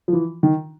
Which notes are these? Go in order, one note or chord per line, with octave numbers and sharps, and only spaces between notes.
F3
E3
D#3